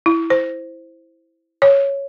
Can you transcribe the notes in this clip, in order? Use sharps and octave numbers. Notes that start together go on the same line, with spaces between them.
E4
C5
C#5